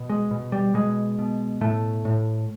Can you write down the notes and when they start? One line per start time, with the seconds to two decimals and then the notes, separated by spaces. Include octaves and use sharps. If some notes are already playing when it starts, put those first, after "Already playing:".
Already playing: B2
0.10 G#3
0.31 B2
0.52 G3
0.74 B2 G#3
1.19 B2
1.61 A2 A3
2.05 A2